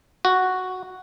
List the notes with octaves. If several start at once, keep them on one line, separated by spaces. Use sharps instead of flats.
F#4